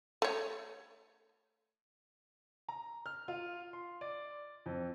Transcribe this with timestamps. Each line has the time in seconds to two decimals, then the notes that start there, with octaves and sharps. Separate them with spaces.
0.22 A3 C#5
2.68 A#5
3.06 F6
3.28 F4
3.73 C6
4.01 D5
4.66 F2